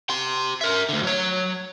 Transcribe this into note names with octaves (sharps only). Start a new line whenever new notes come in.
G4 C6
A#4 E5
D2 D3
F#3 C#5